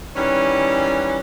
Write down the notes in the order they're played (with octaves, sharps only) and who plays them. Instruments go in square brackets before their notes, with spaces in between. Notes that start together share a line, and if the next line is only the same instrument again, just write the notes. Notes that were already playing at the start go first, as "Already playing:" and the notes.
[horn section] D#3 E3 G3 C#4